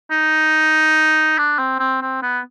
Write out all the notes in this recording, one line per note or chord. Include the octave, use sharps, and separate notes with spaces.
D#4
D4
C4
C4
C4
B3